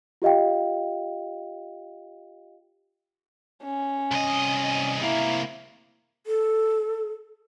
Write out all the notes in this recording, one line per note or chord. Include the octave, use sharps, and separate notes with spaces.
F4 G4 D#5 F5 G5
C#4
C2 D#5
C3 A#3 E4
A4